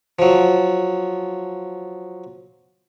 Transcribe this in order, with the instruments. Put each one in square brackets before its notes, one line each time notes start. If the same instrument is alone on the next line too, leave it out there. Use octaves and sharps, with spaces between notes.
[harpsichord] F3 F#3